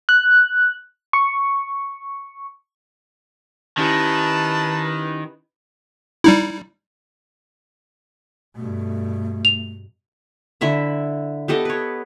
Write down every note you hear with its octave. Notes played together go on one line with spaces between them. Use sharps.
F#6
C#6
D#3 C#4 E4 G4 B4 A5
G3 D#4 E4
G2 B2 A3
F7
D3 E4 E5 B5
B3 G4 A4 D#5
B4 C#5